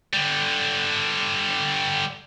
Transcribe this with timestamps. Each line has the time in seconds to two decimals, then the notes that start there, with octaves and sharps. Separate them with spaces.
0.14 D3 G3